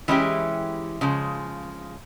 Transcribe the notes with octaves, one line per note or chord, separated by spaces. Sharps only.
E3 G#3 C#4 E4 G4
C#3 F3 G#3